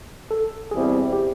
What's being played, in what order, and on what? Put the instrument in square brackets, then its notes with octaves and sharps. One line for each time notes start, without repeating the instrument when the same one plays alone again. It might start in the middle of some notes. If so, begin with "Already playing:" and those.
[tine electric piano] A4
[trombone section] E2 B2 G3 C4 E4 [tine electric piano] G#4
[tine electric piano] G4